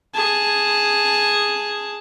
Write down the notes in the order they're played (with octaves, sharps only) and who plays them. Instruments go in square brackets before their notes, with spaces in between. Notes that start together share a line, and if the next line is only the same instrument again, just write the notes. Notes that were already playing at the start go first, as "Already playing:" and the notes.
[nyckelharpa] G#4 A5